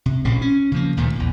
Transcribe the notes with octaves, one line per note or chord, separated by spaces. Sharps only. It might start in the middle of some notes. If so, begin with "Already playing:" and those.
C3
A1 A#2 C#3 C4
C#4
C#3 F3 A#3
D2 A#2 D#3 A3
A#1 E2